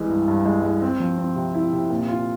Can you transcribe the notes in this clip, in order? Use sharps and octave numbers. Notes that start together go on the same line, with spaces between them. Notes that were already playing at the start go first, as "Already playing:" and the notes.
Already playing: C2 E3 G#3
G2
G2
G#3
G#3
C4
F3
C4
C3
E4
C3
A#2
F4